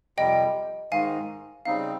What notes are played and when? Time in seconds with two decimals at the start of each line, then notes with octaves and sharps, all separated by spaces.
0.18 F2 C3 G3 D#5 G5
0.92 G#2 D#3 G#3 F5 G#5
1.65 C#3 G3 C4 D#4 F5